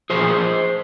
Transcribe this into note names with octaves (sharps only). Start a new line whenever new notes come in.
A#2 F3 G#4 C5